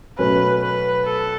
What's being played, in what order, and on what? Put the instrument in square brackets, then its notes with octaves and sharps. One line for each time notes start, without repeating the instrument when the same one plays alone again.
[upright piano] B2 F#3 A3 C#4 [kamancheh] B4
[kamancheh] B4
A4